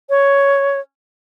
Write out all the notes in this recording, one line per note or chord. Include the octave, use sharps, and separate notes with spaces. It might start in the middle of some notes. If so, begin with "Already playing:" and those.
C#5